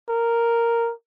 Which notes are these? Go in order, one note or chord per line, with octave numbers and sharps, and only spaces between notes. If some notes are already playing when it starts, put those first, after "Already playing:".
A#4